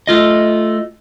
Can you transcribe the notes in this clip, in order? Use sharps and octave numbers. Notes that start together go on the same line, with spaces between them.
A3 F4 D#5